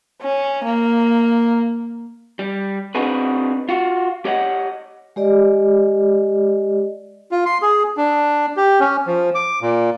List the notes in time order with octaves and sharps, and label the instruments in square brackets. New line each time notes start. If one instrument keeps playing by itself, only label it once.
[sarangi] C#4
A#3
[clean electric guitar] G3
C4 D4 D#4 F#4 G#4 B4
F4 F#4
G4 C#5 D#5 F#5
[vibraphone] G#3 G4 D5 D#5
[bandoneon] F4
C6
G#4
D4
G4
C#4
F3
D6
A#2